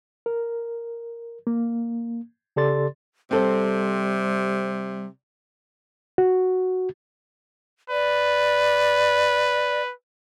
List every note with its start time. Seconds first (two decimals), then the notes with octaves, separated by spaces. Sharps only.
0.26 A#4
1.47 A#3
2.56 C#3 G4 A4 D5 C6 A6
3.31 C3 G3 C4 A4 C5
6.18 F#4
7.90 B4 D5